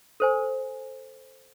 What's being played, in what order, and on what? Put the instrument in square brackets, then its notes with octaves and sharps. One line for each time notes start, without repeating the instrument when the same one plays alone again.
[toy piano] A4 C5 G#5